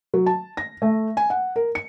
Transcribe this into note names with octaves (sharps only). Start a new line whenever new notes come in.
F#3
A5
A#6
A3
G#5
F#5
A#4
C#7